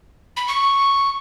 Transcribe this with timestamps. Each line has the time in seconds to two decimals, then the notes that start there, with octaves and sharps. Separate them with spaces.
0.37 B5
0.48 C#6